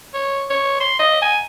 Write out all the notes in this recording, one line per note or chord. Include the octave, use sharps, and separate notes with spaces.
C#5
C#5
C6
D#5
G#5